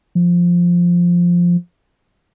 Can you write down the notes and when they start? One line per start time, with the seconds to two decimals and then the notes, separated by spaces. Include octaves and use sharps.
0.15 F3